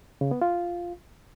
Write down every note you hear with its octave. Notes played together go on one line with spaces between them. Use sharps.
C#3
B3
F4